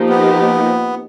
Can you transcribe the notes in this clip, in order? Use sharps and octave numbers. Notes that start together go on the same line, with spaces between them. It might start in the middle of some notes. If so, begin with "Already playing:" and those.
Already playing: F3 A#3 D#4 G4
B3